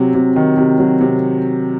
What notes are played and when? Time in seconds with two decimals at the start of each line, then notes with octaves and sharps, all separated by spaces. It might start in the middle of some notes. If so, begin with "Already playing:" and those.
Already playing: C3 F#3
0.14 C3
0.36 D#3
0.57 C3
0.79 F#3
1.01 C3